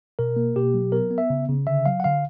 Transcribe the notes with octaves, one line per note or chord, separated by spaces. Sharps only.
B2 A#4
A#3
B2 G4
F#3
B3 A#4
B3
E5
C#3
C#3
D3 E5
F#3 F5
F#5
D3 F5